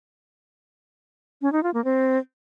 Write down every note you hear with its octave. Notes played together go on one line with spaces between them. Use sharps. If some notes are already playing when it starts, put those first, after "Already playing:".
C#4
D#4
F4
A#3
C4